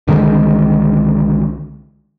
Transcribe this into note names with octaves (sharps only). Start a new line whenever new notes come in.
C2 D3 D#3 G#3